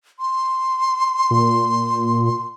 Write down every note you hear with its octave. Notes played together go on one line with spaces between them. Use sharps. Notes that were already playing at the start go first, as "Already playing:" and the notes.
C6
A#2